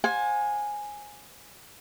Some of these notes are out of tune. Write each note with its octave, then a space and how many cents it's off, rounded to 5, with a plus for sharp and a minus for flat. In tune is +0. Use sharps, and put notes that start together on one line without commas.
C5 +10 F5 +45 G#5 +0